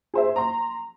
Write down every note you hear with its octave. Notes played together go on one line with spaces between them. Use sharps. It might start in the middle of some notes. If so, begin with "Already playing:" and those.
G#4 C5 E5
A#5 C6